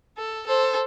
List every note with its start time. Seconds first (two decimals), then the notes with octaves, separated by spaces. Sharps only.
0.16 A4
0.47 A4 C5